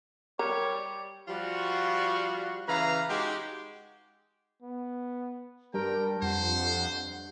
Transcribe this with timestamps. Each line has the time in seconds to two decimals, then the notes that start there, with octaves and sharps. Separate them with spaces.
0.39 G3 A#4 C#5 D6
1.28 F3 G3 F4 F#4
2.67 C#3 E3 B4 F5 A#5
3.09 G#3 D#4 F#4 G4
4.62 B3
5.74 G2 G3 A#4 G5
6.22 F2 C5 F#5